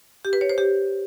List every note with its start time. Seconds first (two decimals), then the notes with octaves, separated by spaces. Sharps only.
0.25 G4
0.33 B4
0.41 C#5
0.49 C5
0.58 G4